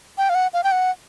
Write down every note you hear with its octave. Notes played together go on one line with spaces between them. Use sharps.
G5
F5
F#5
F5
G5
F#5